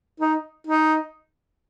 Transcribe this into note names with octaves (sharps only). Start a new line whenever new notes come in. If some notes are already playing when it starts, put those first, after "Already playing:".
D#4
D#4